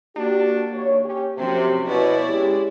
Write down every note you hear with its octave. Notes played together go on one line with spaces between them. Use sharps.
A#3 D4 F#4 G4
D#2 C#5
C#4 G4
F#2 C3 F3 F#4
B2 E4 C#5 D5
G#3 C#4 G4